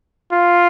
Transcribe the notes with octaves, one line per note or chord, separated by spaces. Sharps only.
F4